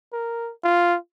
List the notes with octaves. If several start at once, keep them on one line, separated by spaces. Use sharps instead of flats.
A#4
F4